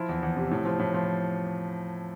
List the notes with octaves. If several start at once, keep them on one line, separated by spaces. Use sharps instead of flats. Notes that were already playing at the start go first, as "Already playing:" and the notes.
Already playing: F3 E4
E2
E2
C3
A2
F3
A2
F3